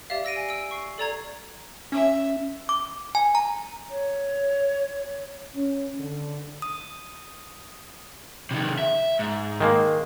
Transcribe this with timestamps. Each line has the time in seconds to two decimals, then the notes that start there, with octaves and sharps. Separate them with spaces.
0.10 G4 D5 E5 F5
0.25 E6 A#6 D7 D#7
0.36 G#5
0.49 E6 D7
0.71 C#6 C7
0.98 A4 D5 A#5 G#6
1.92 C#4 E5
2.69 D6
3.15 G#5
3.35 A#5
3.90 C#5
5.55 C#4
5.99 D3
6.62 D#6
8.51 C3 D#3
8.79 E5
9.19 G#2
9.61 D#3 G#3 A#3